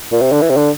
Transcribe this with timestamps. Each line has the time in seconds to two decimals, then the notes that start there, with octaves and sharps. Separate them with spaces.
0.12 A#2
0.22 C3
0.32 D3
0.42 E3
0.50 C3
0.57 D3